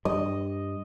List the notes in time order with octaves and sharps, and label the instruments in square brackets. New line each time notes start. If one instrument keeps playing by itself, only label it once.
[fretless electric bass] G2 G3 [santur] D#5